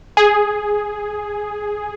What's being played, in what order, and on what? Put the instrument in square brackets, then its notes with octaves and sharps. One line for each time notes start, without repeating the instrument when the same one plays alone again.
[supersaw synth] G#4